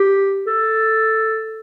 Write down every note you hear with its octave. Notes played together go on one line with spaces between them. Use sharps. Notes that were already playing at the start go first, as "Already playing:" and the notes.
Already playing: G4
A4